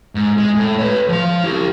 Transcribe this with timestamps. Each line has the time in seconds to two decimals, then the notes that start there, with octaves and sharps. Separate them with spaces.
0.15 G#2
0.37 G#3
0.56 A2
0.79 B4 C#5
1.08 F3 C6
1.44 E4 G4